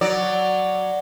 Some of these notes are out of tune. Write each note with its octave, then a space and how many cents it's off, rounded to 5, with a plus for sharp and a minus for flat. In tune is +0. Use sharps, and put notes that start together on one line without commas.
F#3 +0 D5 +0